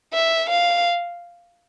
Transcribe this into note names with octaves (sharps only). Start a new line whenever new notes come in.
E5
F5